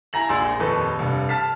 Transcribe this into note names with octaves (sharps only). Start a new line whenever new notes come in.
E4 G#5 A#5 A#6 F#7
A#1 G#4 C6 E6 A6
D#1 F2 A4 B4 C#6
F1 G2
A5 F6 A6 B6